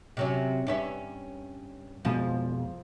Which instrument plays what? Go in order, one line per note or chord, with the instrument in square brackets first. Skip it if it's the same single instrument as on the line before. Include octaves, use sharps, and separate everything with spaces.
[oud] C3 F#3 C#4
G2 C#4 E5
[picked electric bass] F2 B2 G#3 [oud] F3